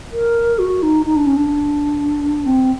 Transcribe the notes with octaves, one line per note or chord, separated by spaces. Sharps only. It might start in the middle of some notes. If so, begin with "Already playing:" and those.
A#4
F#4
D#4
D#4
D4
C#4
D4
C4